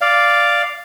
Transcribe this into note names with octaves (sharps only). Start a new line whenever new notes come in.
D5 F5